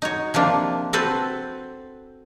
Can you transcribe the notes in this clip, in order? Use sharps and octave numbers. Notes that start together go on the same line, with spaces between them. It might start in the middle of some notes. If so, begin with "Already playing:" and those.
D#4 F#4 C#5
C3 F3 A#3 D4
C4 F#4 A4 B4 C5